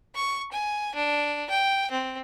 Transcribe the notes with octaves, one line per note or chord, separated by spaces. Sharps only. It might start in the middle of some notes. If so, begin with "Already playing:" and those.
C#6
G#5
D4
G5
C4